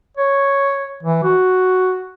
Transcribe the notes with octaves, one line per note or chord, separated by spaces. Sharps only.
C#5
E3
F#4